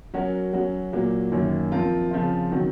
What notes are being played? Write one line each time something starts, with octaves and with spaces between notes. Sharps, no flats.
F#3 C#4 F#4 A#4
F#3 C#4 F#4
A#2 F#3 A#3
F#2 D#3 A#3 C#4
F3 C4 F4 A#4
C#3 F3 C4 F4
D#3 F#3 C4 F#4